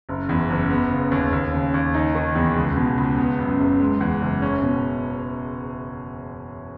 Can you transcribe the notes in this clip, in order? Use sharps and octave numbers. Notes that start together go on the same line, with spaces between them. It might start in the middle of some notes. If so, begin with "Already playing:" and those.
F#1
E2
F#1
B3
C#3
D#2
D#2
C#3
D#2
D#4
D#3
E2
C#2
B2
C#2
B3
F#2
F#1
G#3
E2
F#1
C#4
B2